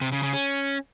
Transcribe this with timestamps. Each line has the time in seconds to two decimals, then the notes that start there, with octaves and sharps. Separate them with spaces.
0.01 C3
0.12 C#3
0.23 C#3
0.34 C#4